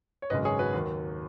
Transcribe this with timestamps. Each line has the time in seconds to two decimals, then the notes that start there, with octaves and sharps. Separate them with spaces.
0.22 C#5
0.30 G#1 F#2 C#3 G#3 B4 D#5
0.45 G#4 C#5
0.59 F#4 B4
0.74 D#2 D#3 F#3